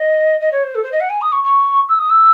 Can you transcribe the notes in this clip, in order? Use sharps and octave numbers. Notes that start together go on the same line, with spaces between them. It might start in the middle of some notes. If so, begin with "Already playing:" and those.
Already playing: D#5
D#5
C#5
C5
A4
C5
D#5
F#5
G#5
D#6
C#6
C#6
E6
D#6
E6